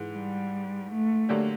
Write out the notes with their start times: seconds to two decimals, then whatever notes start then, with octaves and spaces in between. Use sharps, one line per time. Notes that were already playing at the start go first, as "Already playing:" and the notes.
Already playing: G#2 E3 G#3
0.14 G3
0.91 A3
1.29 D3 F#3 A#3 D4 G4